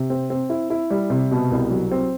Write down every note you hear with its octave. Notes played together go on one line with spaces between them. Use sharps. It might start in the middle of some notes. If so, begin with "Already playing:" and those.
Already playing: C3
C4
C4
E4
E4
G3
C3
B2
C2
F#3
C4